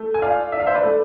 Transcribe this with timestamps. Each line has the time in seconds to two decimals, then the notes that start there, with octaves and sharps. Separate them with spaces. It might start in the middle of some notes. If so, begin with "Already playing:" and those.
Already playing: A3
0.14 G#5
0.22 F4 D5 F5
0.52 D4 E5
0.60 F5
0.67 C5 E5
0.74 B4 D5
0.83 A3